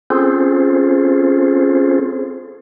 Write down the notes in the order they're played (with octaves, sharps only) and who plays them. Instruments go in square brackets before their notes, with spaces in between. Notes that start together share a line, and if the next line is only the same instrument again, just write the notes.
[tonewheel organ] C4 C#4 F4 G#4 A4 C5